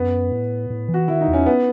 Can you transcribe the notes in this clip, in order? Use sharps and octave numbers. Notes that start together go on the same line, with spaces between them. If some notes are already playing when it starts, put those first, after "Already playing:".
Already playing: F#2 B3
A2
A2
E3
F#4
D#3 E4
D#4
E2
C#4
B3